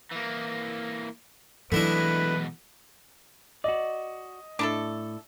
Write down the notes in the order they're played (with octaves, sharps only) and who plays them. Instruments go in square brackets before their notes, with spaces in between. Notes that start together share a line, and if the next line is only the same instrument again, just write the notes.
[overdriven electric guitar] E3 A#3
[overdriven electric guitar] B2 G#3 [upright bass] E3 F#3 [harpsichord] A3 D4 E4 [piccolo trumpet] B4
[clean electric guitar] F#4 D5 [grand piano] D#5
[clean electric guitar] A2 [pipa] D4 E4 A4